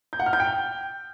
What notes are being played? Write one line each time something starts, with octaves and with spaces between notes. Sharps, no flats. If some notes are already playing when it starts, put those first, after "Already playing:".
G6
F#5
F6
G6
G5